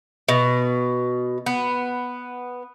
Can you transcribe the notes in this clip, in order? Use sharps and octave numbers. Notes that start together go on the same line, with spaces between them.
B2
B3